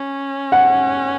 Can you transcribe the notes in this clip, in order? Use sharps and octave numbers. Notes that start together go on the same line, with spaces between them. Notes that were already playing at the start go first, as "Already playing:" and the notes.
Already playing: C#4
F#5